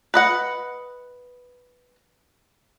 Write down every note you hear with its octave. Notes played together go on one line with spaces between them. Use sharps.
B4 D#5 F#5